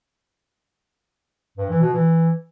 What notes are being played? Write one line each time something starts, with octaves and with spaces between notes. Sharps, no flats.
G2
E3
B2
E3